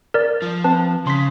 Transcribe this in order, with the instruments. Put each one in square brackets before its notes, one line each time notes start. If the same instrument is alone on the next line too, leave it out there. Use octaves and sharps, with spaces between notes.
[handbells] A#4 D5
[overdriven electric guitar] F3
[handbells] C4 B4 A5
[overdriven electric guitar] C#3 [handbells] C6 B6